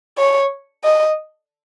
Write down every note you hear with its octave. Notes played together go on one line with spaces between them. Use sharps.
C#5
D#5